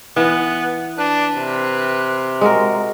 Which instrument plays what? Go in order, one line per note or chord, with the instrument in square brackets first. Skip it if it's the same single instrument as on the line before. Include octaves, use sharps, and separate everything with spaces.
[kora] E3 [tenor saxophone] B3
[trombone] D4 [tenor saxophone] B4
[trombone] C3
[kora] G#3 F#4 A#4